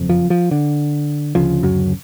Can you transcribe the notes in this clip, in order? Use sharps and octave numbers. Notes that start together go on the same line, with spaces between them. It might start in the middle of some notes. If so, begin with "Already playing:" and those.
Already playing: F#1 F2
F3
F3
D3
D2 C#3 F3
F#2 F#3